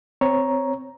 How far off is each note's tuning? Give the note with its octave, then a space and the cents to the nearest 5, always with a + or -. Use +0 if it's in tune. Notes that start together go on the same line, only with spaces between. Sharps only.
C4 -15 C#5 +0 A#5 +10